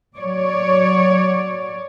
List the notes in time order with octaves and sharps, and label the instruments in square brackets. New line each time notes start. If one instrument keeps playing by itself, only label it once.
[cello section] F#3 C#5 D5